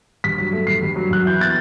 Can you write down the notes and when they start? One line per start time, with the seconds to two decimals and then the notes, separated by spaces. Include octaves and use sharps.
0.24 G2 B6
0.38 F#3
0.53 A3
0.67 G2 C7
0.82 G2
0.96 F#3
1.11 F#2 F#6
1.26 E3 G6
1.40 B3 A6